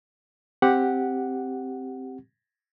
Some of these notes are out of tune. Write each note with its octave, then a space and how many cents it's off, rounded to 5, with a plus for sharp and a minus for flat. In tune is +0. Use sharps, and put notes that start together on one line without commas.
C4 +0 G4 +0 F#5 +0